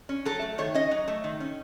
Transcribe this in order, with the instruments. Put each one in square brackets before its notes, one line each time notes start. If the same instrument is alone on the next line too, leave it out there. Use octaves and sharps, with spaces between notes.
[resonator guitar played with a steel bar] C#4
F#3 A4
A3
D#3 C#5
C#4 D#5
F#3
A3
D#3
C#4